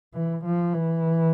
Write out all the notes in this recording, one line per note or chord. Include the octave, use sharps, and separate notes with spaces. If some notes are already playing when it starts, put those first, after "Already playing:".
E3
F3
E3